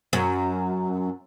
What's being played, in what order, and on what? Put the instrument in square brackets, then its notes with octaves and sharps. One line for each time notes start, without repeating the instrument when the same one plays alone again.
[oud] F#2